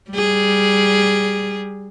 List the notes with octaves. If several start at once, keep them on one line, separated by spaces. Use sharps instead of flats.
G3 G#4